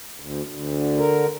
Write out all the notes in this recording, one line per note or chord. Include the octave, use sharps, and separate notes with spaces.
D2
D2
D3
A#4